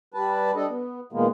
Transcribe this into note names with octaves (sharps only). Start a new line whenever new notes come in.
G3 B4 A5
G3 D4 A4 D#5
B3
A#2 D#3 G#3 A#3 B3